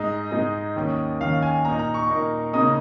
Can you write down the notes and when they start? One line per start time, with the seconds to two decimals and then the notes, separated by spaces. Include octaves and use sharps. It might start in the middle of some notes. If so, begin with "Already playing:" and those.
Already playing: G#2 G#3 D#4 D#5
0.31 G#2 G#3 D#4
0.76 D#2 D#3 C#4
1.20 D#2 D#3 C#4 F5
1.43 G#5
1.65 A#2 A#3 D#4 A#5
1.79 A#5
1.94 C#6
2.09 A#2 A#3 D#4
2.53 C#3 A#3 D#4 D#6